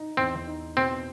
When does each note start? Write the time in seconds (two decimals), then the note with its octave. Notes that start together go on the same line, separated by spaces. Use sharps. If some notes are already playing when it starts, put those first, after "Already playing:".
Already playing: D#4
0.17 E2 C4
0.47 D#4
0.77 B2 C4